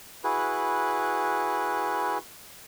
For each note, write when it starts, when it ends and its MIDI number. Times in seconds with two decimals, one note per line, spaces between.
0.24 2.18 64
0.24 2.18 66
0.24 2.18 68
0.24 2.18 71